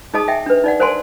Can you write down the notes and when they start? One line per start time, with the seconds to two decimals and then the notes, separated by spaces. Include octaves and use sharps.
0.14 D#4 G#4 D#5 A5 D#6
0.28 D#5 E5 G5 G#5
0.46 D4 B4
0.64 D#4 D5 F#5
0.80 A#4 C5 F#5 G#5 A5 C6